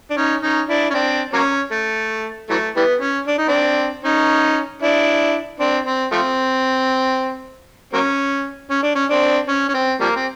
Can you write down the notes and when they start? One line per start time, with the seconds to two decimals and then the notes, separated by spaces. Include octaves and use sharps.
0.11 D4
0.17 C#4 D#4
0.42 C#4 D#4
0.69 D4 E4
0.90 C#4
0.94 C4 D4
1.33 F#3 A#3 C#4
1.72 A3
2.50 E3 F#3 A3
2.76 E3 G3 B3
3.01 C#4
3.28 D4
3.38 D#4
3.48 C4 D4
4.05 C#4 D#4
4.82 D4 E4
5.60 C4 D4
5.87 C4
6.12 F3 A3 C4
7.93 F#3 A#3 C#4
8.71 C#4
8.83 D4
8.96 C#4
9.10 C4 D4
9.49 C#4
9.69 C#4
9.74 C4
10.01 F3 G3 A#3
10.16 C4